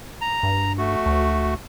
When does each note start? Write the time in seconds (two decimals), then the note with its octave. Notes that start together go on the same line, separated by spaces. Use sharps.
0.21 A#5
0.43 G2
0.78 A3 F#4
1.06 D2